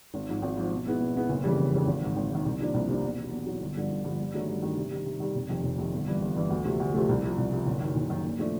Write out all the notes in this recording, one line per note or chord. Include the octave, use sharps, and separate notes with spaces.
G#1
G#2 F3
G#1
G#2 F3
B2
G#3 B3 E4
B2
G#3 B3 E4
F#1
F2 C#3 E3 G3
F#1
F2 C#3 E3 G3
G#1
G#2 D#3
G#1
G#2 D#3
C2
C3 F3 A#3 D4
C2
C3 F3 A#3 D4
E2
B2 F#3
E2
B2 F#3
G1
G2 D3 F3
G1
G2 D3 F3
G2
D#3 F#3 A3 D4
G2
D#3 F#3 A3 D4
C3
D#3 G3
C3
D#3 G3
F1
F2 C3 D#3
F1
F2 C3 D#3
G1
G2 E3
G1
G2 E3
D2
C3 F3 A3
D2
C3 F3 A3
C2
C3 F3
C2
C3 F3
F#1
F#2 D#3
F#1
F#2 D#3
A#2
F3 A3 D4